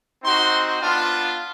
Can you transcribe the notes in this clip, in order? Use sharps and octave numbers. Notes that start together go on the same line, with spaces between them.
C4 D#4 F#4 C6
B3 D4 F4